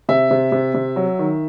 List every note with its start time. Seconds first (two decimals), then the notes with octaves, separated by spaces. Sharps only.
0.09 C3 E5
0.31 C3
0.52 C3
0.74 C3
0.96 F#3
1.19 D#3